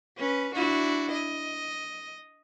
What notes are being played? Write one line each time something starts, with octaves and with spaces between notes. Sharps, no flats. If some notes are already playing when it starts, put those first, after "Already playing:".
C#4 B4
D4 E4 F#4
D#5